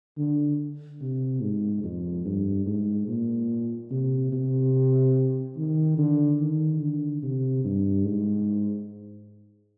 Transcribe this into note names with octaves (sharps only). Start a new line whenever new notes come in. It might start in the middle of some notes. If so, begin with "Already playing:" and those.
D3
C3
G#2
F2
G2
G#2
A#2
C3
C3
D#3
D3
D#3
D3
C3
G2
G#2